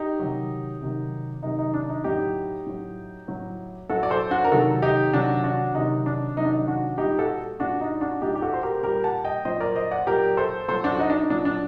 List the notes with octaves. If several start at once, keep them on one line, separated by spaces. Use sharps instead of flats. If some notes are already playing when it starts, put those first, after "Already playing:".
Already playing: D#4 G4
C3 D#3 F#3
C3 D#3 F#3
C3 D#3 F#3 D#4
D#4
D4
D#4
A2 F#3 D#4 G4
A2 F#3
A2 F#3
A2 F#3 F#4 A4
D5
A4 C5
D4 F#4
A#4
C3 D#3 F#3 F#4 A4
D#4 G4
C3 D#3 F#3 D4 F#4
D4 F#4
C3 D#3 F#3 D#4
D4
C3 D#3 F#3 D#4
D4
D#4
D4 F#4
A#2 G3 D#4 G4
F#4 A4
A#2 G3 D4 F#4
D#4
D4 F#4
A#2 G3 D#4 G4
G4
F#4 A4
C5
G4 A#4
A#2 G3 G4 A#4
F#5 A5
D#5 G5
A#2 F#3 C5 D#5
A#4 D5
C5 D#5
D5 F#5
A#2 F#3 G4 A#4
A4 C5
A#2 F#3 A4 C5
D4 F#4
F#4
D#4
D4
D#4
A#2 F#3 D4
D4